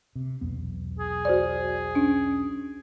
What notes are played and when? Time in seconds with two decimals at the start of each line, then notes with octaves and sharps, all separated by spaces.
0.16 C3
0.41 B1 E2 B3
0.99 G#4
1.25 F#4 C5 D5
1.95 C#4 D4